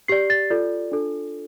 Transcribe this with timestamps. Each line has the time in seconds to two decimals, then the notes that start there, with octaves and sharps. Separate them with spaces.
0.08 G4 D5 C7
0.30 A6
0.50 F4 A4 D5
0.92 D4 F4 A4